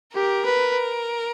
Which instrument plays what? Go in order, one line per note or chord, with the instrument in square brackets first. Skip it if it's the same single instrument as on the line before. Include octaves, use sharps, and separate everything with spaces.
[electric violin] G4 [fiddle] A#4
[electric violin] B4